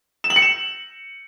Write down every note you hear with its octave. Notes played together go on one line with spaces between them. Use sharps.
E7
F#7
C#7
E7